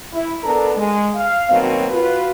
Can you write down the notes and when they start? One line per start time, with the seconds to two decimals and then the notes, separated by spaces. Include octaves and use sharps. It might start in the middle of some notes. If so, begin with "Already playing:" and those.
0.12 E4
0.43 B3 D4 A4 A#4 A#5
0.76 G#3
1.14 F5
1.49 B2 D#3 F#3 A#3 C4
1.91 F4 F#4 B4